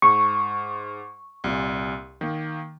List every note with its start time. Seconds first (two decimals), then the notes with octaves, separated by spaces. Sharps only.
0.02 G#2 C#6
1.44 C2 A#2
2.21 D#3 A#3